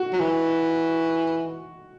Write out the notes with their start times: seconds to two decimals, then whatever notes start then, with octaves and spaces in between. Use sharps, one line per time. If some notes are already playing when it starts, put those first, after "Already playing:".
Already playing: F#4
0.13 F#3
0.19 E3